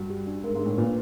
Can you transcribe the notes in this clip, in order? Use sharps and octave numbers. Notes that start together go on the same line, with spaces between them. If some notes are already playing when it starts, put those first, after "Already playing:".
Already playing: G2 F#4
G4
D4
G#2 A#4
G#2
D4
A2
A#2 B4